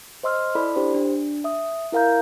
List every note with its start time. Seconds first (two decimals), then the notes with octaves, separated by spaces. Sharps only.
0.23 C5 D#5 C6 E6 F6
0.55 E4 A4 D5 B5
0.76 D4 G4 C5
0.95 D4
1.44 E5 D#6
1.92 E4 A#4 F5 A#5 G6